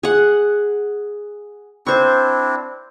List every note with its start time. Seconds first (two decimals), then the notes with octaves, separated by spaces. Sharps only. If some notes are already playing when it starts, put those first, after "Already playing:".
0.03 G#4 F#5
1.86 C4 D4 E4 C5 C#6